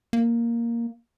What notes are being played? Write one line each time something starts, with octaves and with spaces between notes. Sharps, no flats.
A#3